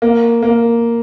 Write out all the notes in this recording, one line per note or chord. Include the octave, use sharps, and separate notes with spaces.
A#3
A#3